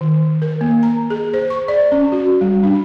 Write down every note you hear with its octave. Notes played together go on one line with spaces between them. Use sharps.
D#3
A#4
A#3
A#5
G#4
C5
C#6
D5
C#4
F#4
G3
D4